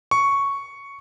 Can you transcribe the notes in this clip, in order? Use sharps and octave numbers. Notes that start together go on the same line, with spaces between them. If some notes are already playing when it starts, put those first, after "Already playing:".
C#6